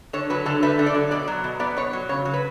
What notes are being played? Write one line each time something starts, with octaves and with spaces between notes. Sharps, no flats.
D3 C#5
F#3 B4
D3 A4
A3 B4
D3
D5
F#3
B2 D5
F#3
B2
B3 D5
B2 C#5
F#3
C#3 C#5
F#3
B4